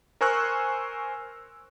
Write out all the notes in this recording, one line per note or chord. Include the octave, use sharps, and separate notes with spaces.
A#4 C5 G#5 C#6 E6 F#6